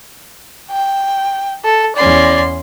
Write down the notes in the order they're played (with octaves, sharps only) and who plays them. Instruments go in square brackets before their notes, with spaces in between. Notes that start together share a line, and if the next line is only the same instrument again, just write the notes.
[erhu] G5
A4
[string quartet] E2 C#4 C6 [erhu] D5